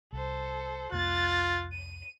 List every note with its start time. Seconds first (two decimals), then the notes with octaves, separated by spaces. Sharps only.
0.13 C2 A4 C5
0.92 C2 F2 A#3 F4 F#6 A6
1.72 D#7